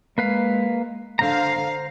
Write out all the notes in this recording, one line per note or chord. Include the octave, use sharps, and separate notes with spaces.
G#3 A#3 B4 F5
D3 C5 F5 A#5